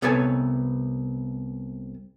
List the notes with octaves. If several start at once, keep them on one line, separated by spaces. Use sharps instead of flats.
C2 B3 A4 B4 C#5 G#5